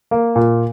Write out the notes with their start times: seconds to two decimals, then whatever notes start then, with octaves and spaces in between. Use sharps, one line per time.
0.11 A#3
0.36 A#2